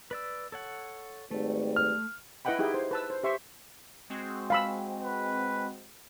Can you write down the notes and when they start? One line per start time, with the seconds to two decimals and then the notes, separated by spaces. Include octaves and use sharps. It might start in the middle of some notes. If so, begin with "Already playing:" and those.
0.11 B4 D5 E6
0.52 A4 C#5 F#5
1.31 G#1 G3 A3 B4
1.76 F6
2.45 E4 B4 D#5 F#5 G5 B5
2.59 D#4 E4 G4 G#4 G5
2.74 C5
2.91 B4 A5 E6
3.10 C5
3.23 G4 C5 E5 C6 C#6
4.10 G#3 C4 F#4
4.50 F5 B5 E6
5.01 B4